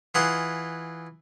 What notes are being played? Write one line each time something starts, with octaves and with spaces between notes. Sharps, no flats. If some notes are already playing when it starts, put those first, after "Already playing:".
E3 F4 G#4 F#5 C6